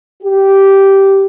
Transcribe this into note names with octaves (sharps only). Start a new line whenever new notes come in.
G4